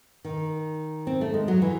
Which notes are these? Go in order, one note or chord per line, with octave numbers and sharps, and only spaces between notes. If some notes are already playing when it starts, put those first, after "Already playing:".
D#3
C4
A3
G#3
F#3
E3